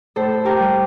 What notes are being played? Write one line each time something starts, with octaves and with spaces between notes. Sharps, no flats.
A2 A4 C5
G4 A#4
G3